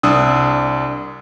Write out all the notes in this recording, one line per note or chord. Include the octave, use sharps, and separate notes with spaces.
C2 D4 D#6 E6